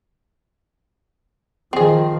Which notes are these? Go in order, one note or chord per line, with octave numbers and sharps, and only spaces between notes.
D#3 F3 C4 G#4